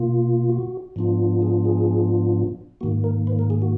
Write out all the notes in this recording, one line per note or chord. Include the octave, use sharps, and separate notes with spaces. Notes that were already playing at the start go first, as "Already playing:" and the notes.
Already playing: B2 A#3 F4
F#4
G#2 F3 B3 D4 F4
G#4
G#4
G#2 D#3 A#3 F#4
A#4
B4
A#4
G#4
F#4